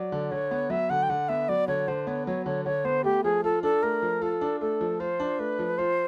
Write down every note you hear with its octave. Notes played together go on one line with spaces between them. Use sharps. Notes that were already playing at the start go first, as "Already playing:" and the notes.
Already playing: F#3 D5
D3
D3 C#5
B3
F#3 E5
D3 F#5
G5
D3 F#5
B3 E5
F#3 D5
D3 C#5
D3 C5
B3 C#5
F#3 C#5
D3 C#5
D3 C#5
B3 C5
A3 G4
F3 G#4
F4 A4
D4 A4
A3 A#4
F3
F4 A4
D4
A3 A4
F3
F4 C5
D4
A3 B4
F3
F4 C5